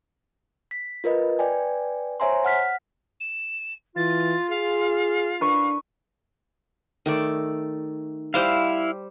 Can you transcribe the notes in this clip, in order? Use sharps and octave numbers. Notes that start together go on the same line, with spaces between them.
B6
F4 A#4 B4 D#5
B4 D5 G5 G#5
C5 C#5 E5 G#5 A#5 C6
F#5 F6 B6
E7
E3 F4 A6
G#4 F5
D4 B4 C#6
D#3 A3 D5
G3 E4 C5 F5 D6